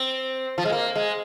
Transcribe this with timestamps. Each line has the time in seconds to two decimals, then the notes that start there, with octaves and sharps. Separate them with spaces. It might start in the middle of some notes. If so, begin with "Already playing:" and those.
Already playing: C4
0.58 F3
0.65 G#3
0.72 A#3
0.95 G#3